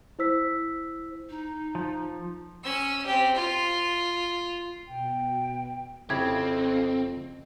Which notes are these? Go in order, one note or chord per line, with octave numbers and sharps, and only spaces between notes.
E4 C5 E6 B6
D#4
F3
C#4 E6
C4 G4
F4
B2 G5
F2 C#3 C4 E4 G4 G#6